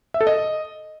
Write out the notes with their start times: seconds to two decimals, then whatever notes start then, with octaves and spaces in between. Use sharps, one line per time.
0.14 E5
0.21 A4
0.27 D#5